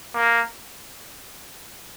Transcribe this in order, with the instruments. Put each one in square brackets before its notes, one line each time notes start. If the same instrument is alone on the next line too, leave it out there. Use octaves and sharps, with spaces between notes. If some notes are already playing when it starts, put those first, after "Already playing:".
[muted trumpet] A#3